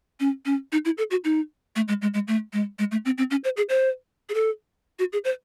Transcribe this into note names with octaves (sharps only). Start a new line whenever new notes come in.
C#4
C#4
D#4
E4
A4
F#4
D#4
A3
G#3
G#3
G#3
A3
G#3
G#3
A3
C4
C4
C#4
C5
G#4
C5
G#4
A4
F#4
G#4
C5